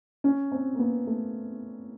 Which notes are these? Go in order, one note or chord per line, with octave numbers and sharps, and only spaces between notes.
C#4
C4
A#3
B3
A3